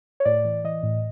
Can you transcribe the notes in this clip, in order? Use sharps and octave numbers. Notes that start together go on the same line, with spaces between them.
C#5
A2 D5
E3
E3 D#5
A2